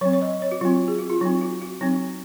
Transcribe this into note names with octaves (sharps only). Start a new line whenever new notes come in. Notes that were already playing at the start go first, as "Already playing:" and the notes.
F#3 C4 C#5
C#5
D#5
C#5
F#4
F#3 C4 F4
G#4
F#4
F4
F#3 C4 D#4
F#4
F#4
F#3 C4 D#4